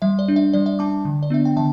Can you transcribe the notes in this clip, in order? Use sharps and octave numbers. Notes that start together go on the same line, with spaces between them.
G3 E5
D5
D4
E5
G3 D5
E5
D4 A5 D6
D3
D5
B3 D4 E5
G5
D3 E5 A5